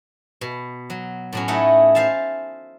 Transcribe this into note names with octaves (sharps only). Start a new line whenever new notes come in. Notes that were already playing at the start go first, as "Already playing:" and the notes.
B2
F#3
A2 F#3 C#4
A3 D#4 E4 F#4 C#5 D#5
C5 E5 F5 G#5 A5